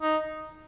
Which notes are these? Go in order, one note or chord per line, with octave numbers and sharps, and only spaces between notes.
D#4